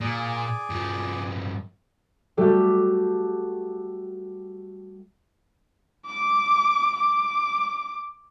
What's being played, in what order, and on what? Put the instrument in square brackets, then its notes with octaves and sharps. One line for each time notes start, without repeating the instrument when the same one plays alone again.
[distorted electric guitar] A#2 [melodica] G#4 D5
[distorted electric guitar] G2 F3
[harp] G3 A3 F#4 G4 A4
[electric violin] D6
D6